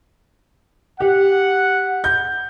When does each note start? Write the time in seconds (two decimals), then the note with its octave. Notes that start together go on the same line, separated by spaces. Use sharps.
1.00 G4 F#5
2.04 G6